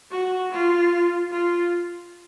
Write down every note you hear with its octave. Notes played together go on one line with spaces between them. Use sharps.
F#4
F4
F4